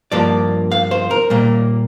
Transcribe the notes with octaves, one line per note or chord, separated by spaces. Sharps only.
G2 F3 A#3 D5
F5
C5
A#4
A#2 G3 A#3